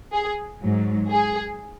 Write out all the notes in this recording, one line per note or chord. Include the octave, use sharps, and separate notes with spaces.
G#4
G#2 F#3
G#4